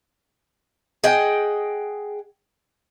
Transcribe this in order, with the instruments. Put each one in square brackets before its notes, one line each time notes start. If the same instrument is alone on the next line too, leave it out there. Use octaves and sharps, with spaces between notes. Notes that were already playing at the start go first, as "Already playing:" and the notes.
[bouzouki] G#4 D#5 F#5 G5